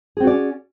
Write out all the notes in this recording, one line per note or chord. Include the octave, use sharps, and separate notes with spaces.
C4 C#4 F#4 G#4 D5